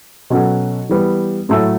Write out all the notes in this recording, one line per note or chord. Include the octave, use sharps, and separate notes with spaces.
B2 F#3 C#4 F#4 A4
E3 G3 B3
A2 F#3 A3 E4 A4